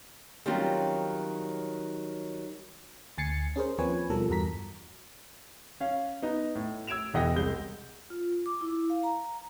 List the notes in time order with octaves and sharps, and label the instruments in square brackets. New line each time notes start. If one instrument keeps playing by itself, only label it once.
[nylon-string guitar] D#3 F#3 G3 C4 C#4 F4
[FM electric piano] D2 G#5 A6 C7 C#7
C#4 G#4 A#4 C5
D#2 F3 C4 B4 C#5 G#5
B2 F3 G3 A4 A#4
E2 G2 F#4 A#5 B6
[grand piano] C#4 F5
B3 D#4
A2
E6 G#6 D7 E7 F7
E1 E2 D#5 F#5 G5 A#6
C2 G#3 G6 G7
[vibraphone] F4
D6
E4
F5
A#5